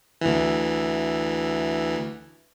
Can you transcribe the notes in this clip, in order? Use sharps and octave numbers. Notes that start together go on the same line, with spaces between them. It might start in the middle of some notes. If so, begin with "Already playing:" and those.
D2 E3